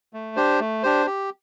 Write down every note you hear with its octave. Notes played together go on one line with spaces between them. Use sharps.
A3
D4 G4 C5
A3
D4 G4 C5
G4